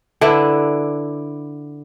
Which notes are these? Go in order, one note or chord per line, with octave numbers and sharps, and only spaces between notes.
D3 D4 E4 B4